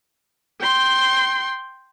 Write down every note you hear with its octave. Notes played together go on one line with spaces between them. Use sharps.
G5 C6